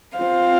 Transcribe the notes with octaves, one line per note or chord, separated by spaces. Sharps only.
C4 F4 C5 F5